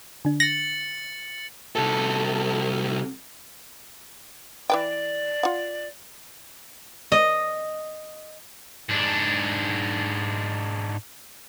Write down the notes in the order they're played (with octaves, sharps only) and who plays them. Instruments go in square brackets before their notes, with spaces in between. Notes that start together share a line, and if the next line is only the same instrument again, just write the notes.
[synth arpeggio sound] D3 D4
[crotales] A6 C#7 F#7 [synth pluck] A#6
[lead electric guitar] C2 A4
[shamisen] E3 B4 G5 [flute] D5
[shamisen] F4 F#5
[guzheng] D#5
[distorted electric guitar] G#2 D4